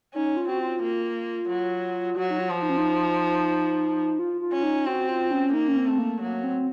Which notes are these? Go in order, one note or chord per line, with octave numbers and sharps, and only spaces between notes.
C#4 D#4
F4
C4 F#4
F4
A#3
F#3
F#3 F#4
D#4
F4
F3
D#4
C#4
D#4
F4
F4
C#4
D#4
C4 F#4
F4
C#4
A#3 D#4
C#4
C4
A3
A#3
F#3 A#3
C4